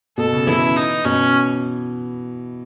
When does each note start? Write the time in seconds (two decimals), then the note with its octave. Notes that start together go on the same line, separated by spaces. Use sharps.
0.18 B2 A4
0.32 C#3
0.47 E3 E4
0.76 D#4
1.05 B2 C#4